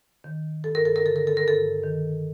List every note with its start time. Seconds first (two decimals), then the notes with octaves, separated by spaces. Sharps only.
0.24 D#3
0.64 G2 A4
0.75 A#4
0.85 A4
0.96 A#4
1.04 D3 A4
1.16 A#4
1.27 A4
1.37 A#4
1.44 G2 A4
1.83 D#3